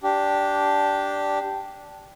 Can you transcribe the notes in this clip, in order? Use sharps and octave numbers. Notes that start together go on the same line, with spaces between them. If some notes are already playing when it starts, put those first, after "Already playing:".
D4 G4